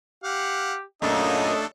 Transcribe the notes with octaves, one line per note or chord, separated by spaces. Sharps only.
G4 F5 F#5
F#2 A#2 A3 D4 D#4 G#4 A4 D#5